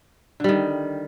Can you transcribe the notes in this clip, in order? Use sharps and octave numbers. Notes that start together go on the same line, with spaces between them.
D3 D#3 G3